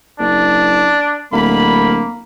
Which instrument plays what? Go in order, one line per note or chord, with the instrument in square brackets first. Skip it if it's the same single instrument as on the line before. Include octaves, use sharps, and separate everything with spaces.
[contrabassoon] F#1 [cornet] D4
[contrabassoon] D1 [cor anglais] A#3 [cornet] B5